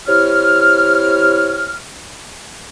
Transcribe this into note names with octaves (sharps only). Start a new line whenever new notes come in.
C3 E4 C#5 F6